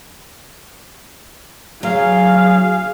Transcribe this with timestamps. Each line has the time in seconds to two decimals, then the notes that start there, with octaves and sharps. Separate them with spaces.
1.83 F#3 G#4 F5